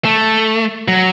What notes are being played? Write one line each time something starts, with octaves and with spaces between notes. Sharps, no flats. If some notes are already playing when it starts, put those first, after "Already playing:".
A3
F#3